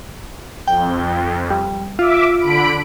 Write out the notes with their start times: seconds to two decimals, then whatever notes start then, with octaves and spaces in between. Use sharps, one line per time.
0.68 F2 G5
1.50 G3
1.99 F4 E5 D6
2.39 D3 B5 D7